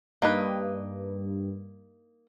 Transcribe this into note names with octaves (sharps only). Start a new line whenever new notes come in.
G2 A#3 D#4 B4